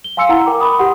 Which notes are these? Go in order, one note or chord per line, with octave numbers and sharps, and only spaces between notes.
G7
F5 G#5 C6 E6 C#7
E4 F#5 A#5
A#4 G5 D6
B5 D#6
G4 F#5 C6